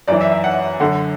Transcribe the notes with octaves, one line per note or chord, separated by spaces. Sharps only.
F#2 E3 D5
E5
E5
F#5
F#2 D3 F#5